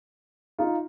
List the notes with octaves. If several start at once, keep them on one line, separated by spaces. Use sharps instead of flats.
D#4 F4